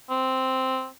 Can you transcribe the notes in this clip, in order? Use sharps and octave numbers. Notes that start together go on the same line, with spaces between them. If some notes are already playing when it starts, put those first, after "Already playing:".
C4